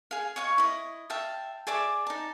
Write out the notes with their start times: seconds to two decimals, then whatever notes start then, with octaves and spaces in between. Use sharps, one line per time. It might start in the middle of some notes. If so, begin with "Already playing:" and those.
0.11 G#4 F5
0.36 C#5 D#5 F5 C#6
0.58 E4 D#5
1.10 E5 F5 G5 A5
1.67 G#4 D5 E5 D6
2.07 D#4 A5